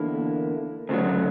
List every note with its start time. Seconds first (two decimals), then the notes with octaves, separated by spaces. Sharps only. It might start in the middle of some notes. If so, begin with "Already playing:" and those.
Already playing: E2 D3 A#3 E4
0.89 D2 C#3 F#3